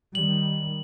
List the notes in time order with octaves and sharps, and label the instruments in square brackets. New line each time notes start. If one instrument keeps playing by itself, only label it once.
[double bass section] D#3 G3 [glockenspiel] F#7